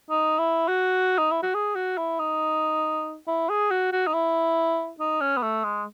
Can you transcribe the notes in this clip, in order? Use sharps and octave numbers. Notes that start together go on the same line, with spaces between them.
D#4
E4
F#4
D#4
E4
F#4
G#4
F#4
E4
D#4
E4
G#4
F#4
F#4
D#4
E4
D#4
C#4
B3
A3
G#3